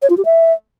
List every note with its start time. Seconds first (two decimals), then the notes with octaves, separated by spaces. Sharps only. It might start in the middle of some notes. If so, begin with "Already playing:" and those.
0.02 C#5
0.10 F4
0.17 G4
0.25 E5